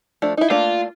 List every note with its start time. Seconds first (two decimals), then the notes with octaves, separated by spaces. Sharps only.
0.22 F3 A3 D4
0.37 D#4 E4
0.50 A3 A#3 D4 F4